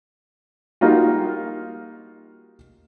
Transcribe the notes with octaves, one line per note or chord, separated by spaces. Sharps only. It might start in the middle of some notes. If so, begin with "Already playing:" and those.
G3 A#3 D#4 F4 F#4